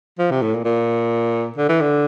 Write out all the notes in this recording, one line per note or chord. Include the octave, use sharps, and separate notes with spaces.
F3
C3
A2
A#2
A#2
D3
E3
D3